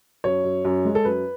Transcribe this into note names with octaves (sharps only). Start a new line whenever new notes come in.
F#2 C#5
F#2
F#2
G#3
A4
F#2 B4